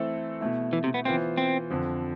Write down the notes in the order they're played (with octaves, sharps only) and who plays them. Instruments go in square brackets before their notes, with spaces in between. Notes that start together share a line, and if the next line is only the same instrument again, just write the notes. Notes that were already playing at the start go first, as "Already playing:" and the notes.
Already playing: [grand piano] E3 A3 C4 E4 A4
B2 A3 E4
[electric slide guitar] E3
C3
B3
[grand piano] E3 B3 F4 C5 [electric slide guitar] C4
[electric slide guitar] C4
[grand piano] F2 D3 F3